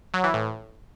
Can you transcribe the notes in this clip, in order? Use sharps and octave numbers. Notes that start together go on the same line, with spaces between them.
F#3
E3
A2